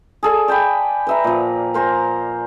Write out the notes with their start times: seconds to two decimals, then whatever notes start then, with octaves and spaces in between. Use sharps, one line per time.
0.23 G#4 A4 D5
0.48 D5 G5 G#5 B5
1.07 B4 E5 A#5
1.24 A#2 F3
1.74 A#4 C5 G#5 A#5